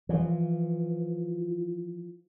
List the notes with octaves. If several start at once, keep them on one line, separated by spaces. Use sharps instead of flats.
E3 F3